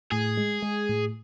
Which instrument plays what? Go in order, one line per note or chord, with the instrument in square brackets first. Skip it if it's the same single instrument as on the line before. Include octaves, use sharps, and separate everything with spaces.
[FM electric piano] A2 [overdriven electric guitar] G#4
[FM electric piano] G#3
G#3
A2